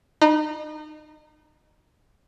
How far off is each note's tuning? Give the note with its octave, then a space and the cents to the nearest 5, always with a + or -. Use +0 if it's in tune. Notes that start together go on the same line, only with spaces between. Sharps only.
D#4 -30 A#5 +40